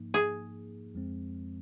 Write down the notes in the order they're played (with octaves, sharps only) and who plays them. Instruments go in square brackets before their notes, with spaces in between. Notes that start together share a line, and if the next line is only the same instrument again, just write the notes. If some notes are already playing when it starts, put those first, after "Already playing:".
Already playing: [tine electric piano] G#2 F3 A#3 D#4
[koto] G#4
[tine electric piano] F2 F3 G#3 C4